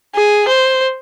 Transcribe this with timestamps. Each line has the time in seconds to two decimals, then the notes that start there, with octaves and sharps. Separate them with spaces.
0.15 G#4
0.48 C5